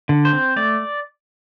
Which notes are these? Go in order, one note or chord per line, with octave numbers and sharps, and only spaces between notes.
D3
C5
C4
A3 D5